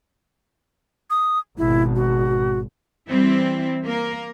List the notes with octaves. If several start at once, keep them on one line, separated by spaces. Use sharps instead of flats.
D#6
G#1 B2 E4
F#4
E3 G3 C4 E4
A#3 A#4